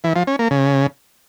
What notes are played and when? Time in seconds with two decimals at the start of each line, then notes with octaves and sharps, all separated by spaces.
0.04 E3
0.16 F3
0.27 C#4
0.39 A#3
0.51 C#3